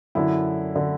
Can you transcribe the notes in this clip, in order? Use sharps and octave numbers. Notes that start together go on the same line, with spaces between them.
F#2 D3 E4
D3